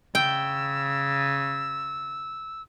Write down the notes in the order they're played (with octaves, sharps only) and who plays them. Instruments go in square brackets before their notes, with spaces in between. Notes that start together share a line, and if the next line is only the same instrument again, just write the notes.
[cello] C#3 [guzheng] G5 [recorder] E6